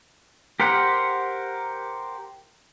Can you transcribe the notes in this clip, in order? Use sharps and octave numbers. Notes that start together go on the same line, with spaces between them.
G4 A#4 C5 F#5